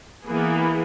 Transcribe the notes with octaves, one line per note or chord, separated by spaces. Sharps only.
E3 A#3 B3 G#4